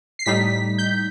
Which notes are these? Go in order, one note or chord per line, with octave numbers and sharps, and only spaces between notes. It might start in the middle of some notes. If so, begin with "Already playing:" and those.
C7
A2 G3 D#4 B6
G6